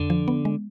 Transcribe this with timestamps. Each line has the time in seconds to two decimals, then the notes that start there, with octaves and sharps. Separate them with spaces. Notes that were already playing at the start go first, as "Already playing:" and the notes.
Already playing: F2 D3
0.10 F3
0.28 B3
0.45 G#3